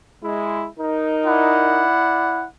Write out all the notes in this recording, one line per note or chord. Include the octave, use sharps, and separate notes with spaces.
G#3 E4
D#4 A#4
E4 D5 F#5